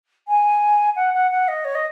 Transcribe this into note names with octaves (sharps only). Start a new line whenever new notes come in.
G#5
F#5
F#5
F#5
D#5
C#5
D#5